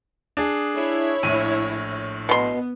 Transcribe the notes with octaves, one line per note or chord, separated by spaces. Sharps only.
D4 G#4
E4 C#5
A#1 A2 D#7
B2 B3 C6